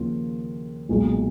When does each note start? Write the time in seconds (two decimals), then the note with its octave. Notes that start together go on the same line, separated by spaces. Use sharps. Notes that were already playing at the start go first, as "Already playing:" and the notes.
Already playing: D#2 C#3 F3 A#3 F4
0.89 B1 A#2 G#3